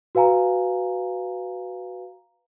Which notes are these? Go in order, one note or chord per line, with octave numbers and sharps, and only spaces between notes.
F#4 B4 F5 G#5 A#5